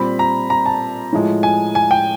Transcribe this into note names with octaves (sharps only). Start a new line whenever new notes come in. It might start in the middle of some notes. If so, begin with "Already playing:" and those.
Already playing: A#2 G3 C4 B5
A#5
A#5
A5
A2 F3 G#3
G#5
G#5
G5